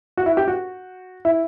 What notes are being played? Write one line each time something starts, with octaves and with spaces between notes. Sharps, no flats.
F#4
E4
G4
F#4
E4